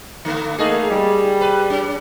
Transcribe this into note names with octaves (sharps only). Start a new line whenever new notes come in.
D3 A3 B3
A3 A#3 D#4 G#4
G3
B4
C#4